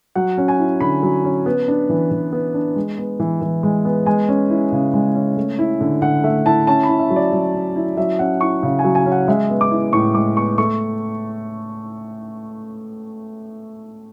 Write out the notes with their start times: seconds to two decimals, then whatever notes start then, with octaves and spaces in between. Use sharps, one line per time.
0.15 F#3 F#5
0.38 C#4
0.48 G#5
0.59 E4
0.81 D3 B5
1.03 F#3
1.25 C#4
1.46 B3
1.68 D4
1.89 E3
2.11 E3
2.33 B3
2.54 D4
2.76 G#3
2.98 B3
3.20 E3
3.41 E3
3.63 G#3
3.85 B3
4.06 G#3 G#5
4.29 C#4
4.50 E4
4.72 C#3
4.93 G#3
5.15 C#4
5.37 A3
5.59 E4
5.81 D3
6.02 D3 F#5
6.24 A3 E5
6.46 E4 A5
6.67 C#4 A5
6.83 B5
6.89 E4
6.99 E5
7.10 F#3
7.16 D5
7.33 F#3
7.54 C#4
7.76 E4
7.97 F#3 E5
8.19 C#4 F#5
8.41 E4 C#6
8.63 C#3
8.79 G#5
8.84 F#3
8.95 G#5
9.06 C#4
9.12 F#5
9.28 G#3 E5
9.50 B3
9.61 D6
9.71 E4
9.93 A2 C#6
10.15 G#3 D6
10.37 B3 C#6
10.58 A3 C#6